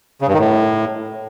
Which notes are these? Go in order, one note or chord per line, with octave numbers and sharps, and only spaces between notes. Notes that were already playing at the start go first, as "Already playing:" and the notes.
C#3
G2
D#3
A2